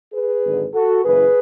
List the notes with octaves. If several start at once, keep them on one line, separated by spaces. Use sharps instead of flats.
G#4 B4
G#1 F#2 D3
F#4 A4
F#1 F#2 C#3 E3 G#4 B4